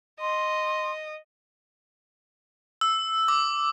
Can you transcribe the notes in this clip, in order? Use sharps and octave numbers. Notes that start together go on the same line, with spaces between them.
D#5 C6
E6
D6